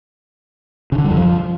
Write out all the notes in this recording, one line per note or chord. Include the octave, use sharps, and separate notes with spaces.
C#3
D3
G3
F2
F3